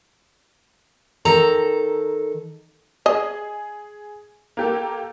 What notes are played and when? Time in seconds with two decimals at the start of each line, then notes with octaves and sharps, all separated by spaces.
1.25 D#3 A4 A#5
3.06 G#4 D#5
4.57 A#3 G4 A4